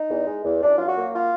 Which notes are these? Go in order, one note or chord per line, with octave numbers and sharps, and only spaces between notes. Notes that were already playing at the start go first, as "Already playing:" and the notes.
Already playing: D#4
E2
G#3
E2
F#2 D4
F#3 F4
F#4
A#3
F4